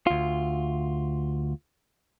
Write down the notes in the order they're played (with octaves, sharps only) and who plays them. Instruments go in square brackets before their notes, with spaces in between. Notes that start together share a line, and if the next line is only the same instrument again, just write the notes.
[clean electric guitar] D2 F4